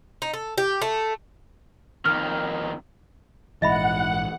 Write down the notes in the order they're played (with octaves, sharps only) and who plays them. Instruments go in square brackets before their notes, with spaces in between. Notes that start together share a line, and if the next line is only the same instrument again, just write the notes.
[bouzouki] D#4
A4
G4
A3
[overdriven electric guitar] F2 D#3 [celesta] F6
[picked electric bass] A#1 G#2 E3 [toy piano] D#5 E5 B5 [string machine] F#5